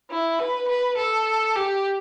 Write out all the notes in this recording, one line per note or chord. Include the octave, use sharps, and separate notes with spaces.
E4
B4
B4
A4
G4